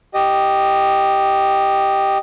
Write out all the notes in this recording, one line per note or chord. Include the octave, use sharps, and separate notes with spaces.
G4 D#5